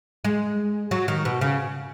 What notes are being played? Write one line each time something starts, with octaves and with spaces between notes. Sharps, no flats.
G#3
F#3
D#3
B2
C#3